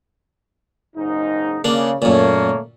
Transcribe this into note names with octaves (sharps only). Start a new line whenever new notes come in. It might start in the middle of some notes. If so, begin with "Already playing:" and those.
F#1 G#2 D#4
C#3 A#3 D4
F#2 A#2 A3 A#3 C#5